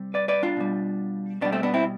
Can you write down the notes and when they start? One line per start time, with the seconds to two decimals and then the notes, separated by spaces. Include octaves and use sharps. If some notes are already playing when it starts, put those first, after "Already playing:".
Already playing: C3 G3
0.14 B4 D5
0.28 B4 D5
0.43 D4 F4
0.57 B2 G3
1.41 B2 G3 B3 D4
1.52 A3 C4
1.63 B3 D4
1.74 C4 E4